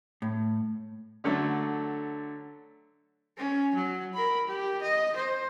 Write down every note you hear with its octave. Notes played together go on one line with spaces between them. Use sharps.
A2
D3 F#3 A3 A4
C#4
F#3
A#4 B5
G4
D#5
C5